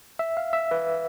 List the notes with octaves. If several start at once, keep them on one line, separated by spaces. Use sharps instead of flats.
E5
F5
E5
B4